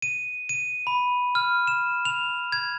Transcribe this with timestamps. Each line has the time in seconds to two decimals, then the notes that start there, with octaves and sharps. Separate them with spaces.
0.02 D#7
0.49 D#7
0.87 B5
1.35 F6
1.67 E7
2.05 F7
2.52 G#6